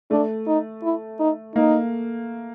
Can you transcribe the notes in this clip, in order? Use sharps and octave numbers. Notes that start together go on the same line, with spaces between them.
A3 D4
D#4
E4
D#4
A#3 D#4